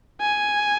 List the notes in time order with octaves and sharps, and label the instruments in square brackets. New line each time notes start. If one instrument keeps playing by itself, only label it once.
[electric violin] G#5